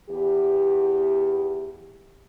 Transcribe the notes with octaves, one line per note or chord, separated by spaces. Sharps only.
E2 G4